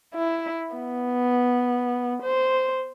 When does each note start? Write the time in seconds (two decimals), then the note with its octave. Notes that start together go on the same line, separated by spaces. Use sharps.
0.15 E4
0.74 B3
2.23 C5